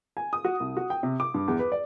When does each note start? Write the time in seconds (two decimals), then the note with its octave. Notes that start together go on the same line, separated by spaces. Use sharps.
0.17 G#5
0.33 D#6
0.45 F#4
0.60 C2
0.77 F#4
0.90 G5
1.03 C3
1.20 D6
1.34 G2
1.48 E2
1.59 B4
1.72 D5